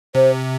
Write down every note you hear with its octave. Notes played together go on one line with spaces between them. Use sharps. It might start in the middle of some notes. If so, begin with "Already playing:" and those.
C3 C5